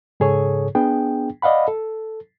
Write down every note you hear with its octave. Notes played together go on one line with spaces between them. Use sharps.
G#2 C#3 G#4 A4 C#5
B3 D4 G#4 G5
D5 D#5 F5 F#5 B5
A4